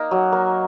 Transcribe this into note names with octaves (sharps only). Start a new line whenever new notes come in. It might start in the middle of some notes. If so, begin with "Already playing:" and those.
Already playing: A#3 D#4
F#3
A#3